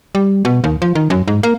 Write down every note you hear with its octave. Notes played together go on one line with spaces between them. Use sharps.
G3
B2
D#2
F3
D#3
F#2
G#2
A#3